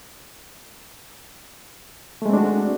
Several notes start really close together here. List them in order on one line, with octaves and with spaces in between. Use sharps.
A3 G#3 C4 D4 F#4